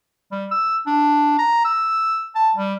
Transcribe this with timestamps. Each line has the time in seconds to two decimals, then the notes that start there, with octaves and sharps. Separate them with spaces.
0.32 G3
0.52 E6
0.87 D4
1.39 A#5
1.65 E6
2.36 A5
2.56 G3